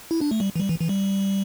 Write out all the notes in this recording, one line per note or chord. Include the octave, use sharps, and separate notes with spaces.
E4
D4
A3
G3
E3
G3
E3
E3
G3